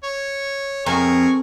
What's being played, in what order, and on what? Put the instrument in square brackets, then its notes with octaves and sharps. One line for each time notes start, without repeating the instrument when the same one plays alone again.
[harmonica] C#5
[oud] F2 [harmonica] G#4 A#4 C#6